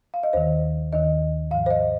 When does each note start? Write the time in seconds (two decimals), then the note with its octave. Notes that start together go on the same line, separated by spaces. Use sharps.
0.14 F5
0.23 D#5
0.33 D#2 D#3 C5
0.92 D#2 D#3 D#5
1.51 G#2 F3 F5
1.66 C5
1.71 D#5